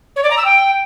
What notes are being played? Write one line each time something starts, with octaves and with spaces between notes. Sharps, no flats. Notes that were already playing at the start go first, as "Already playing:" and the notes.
C#5
D5
A#5
E6
G5